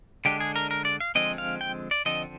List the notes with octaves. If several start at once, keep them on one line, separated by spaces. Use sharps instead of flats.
D3 G#3 D4 G4
G#4
A#4
A#4
D5
F5
D3 F3 G#3 C4 D#5
F5
G5
D5
D3 F3 C4 D#5